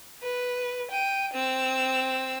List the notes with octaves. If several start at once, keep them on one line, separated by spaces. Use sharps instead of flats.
B4
G5 D#7
C4 E6